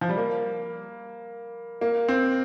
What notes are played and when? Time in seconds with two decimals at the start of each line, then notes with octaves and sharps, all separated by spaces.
0.01 F3
0.09 G3
0.17 A#3
1.81 A#3
2.09 C4